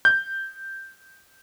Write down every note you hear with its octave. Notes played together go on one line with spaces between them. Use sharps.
G6